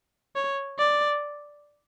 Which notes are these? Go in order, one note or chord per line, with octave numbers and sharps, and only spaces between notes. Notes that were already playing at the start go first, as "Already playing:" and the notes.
C#5
D5